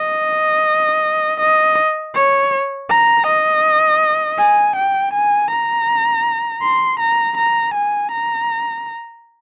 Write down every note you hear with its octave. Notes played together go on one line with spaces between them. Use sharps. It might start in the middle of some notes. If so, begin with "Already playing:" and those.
Already playing: D#5
D#5
C#5
A#5
D#5
G#5
G5
G#5
A#5
C6
A#5
A#5
G#5
A#5